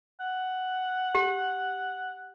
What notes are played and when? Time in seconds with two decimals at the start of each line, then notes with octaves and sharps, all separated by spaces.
0.21 F#5
1.15 G4